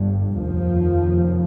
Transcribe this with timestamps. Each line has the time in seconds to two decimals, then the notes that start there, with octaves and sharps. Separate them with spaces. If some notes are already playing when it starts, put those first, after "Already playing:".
Already playing: G1 G2
0.36 F1 D#2 F3